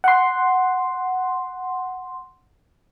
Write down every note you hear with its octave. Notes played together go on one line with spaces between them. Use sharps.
F#5 C6